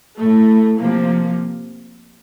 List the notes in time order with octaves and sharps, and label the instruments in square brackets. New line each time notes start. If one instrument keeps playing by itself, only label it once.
[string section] A2 A3
C3 F3 A#3